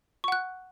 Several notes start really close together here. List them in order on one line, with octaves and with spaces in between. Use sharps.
C#6 F#5 F#6